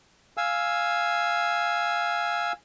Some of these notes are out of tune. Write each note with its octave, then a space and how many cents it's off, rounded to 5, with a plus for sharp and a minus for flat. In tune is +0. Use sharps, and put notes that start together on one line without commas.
F5 +0 G#5 +0 E6 +0